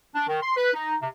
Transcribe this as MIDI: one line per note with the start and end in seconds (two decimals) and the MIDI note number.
0.15 0.24 62
0.28 0.38 51
0.42 0.56 84
0.57 0.71 71
0.74 0.96 63
1.01 1.08 48